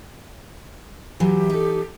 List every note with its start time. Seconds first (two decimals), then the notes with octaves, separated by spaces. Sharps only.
1.20 E3 F#3 G4
1.50 D#4 A4